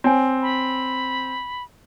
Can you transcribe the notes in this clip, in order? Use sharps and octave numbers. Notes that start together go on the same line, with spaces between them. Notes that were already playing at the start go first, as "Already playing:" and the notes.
C4 C#5 G#5
B5